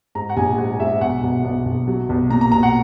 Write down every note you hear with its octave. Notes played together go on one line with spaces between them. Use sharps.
G#2 A#5
F#5
A#1 G#5
G#2 F#5
G#2 E5
B1 F#5
B1
B1
B1
F#3
B1
A#2 A#5
A#5
B1 A#5
F#5